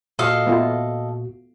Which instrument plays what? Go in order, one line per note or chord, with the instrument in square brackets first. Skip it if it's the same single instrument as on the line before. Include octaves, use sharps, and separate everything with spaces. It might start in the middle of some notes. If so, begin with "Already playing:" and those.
[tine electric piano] A#2 F#4 [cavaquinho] A4 D#5 F5
[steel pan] A3 B3 F4